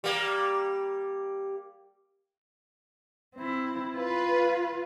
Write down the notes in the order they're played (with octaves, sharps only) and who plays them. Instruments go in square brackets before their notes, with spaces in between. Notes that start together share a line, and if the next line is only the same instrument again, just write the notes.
[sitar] G3 A#3
[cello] C4 E4
[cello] F4 [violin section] B4